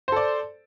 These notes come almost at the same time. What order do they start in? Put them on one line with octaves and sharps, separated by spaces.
C5 A4 D5